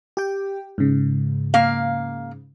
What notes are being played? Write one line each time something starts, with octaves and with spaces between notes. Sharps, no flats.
G4 G5
G#2 C#3
A#3 F5